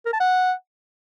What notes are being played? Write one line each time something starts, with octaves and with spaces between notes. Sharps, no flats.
A#4
A5
F#5